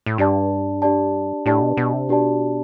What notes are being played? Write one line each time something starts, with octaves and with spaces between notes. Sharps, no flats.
A2
G2 D4 G4 D5 A5
D4 G4 D5 A5
A2 D4 G4 D5 A5
B2
B2
C3
B2 D4 G4 D5 A5